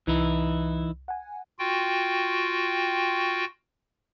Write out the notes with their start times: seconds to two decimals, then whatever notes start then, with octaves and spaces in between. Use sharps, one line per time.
0.07 C2 E3 D#4 E4
1.08 F#5 G#5
1.59 F4 F#4 G5